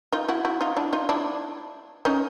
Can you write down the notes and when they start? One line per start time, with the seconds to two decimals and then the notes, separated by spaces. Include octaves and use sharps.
0.12 D#4 F4
0.28 E4 F#4
0.45 E4 F#4
0.61 D#4 F4
0.77 D4 E4
0.93 D#4 F4
1.09 D4 E4
2.05 C#4 D#4